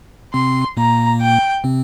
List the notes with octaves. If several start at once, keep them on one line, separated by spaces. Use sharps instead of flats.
C3 C4 C6
A#2 A#3 A#5
G5
C3 C4